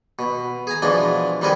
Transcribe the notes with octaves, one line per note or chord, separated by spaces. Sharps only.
B2
G#4 G#5 A#5
B2 E3 F3 G#3 D4
D#3 G3 B3 C4 G#4 A#4